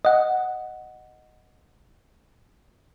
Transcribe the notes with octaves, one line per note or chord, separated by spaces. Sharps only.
D#5 F#5